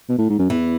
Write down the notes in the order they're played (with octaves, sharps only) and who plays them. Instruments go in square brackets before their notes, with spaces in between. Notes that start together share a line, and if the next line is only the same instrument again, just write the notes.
[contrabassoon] B2
A2
G#2
F#2
[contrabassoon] E2 [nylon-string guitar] E3